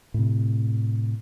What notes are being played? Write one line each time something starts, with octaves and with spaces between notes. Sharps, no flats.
A2 C3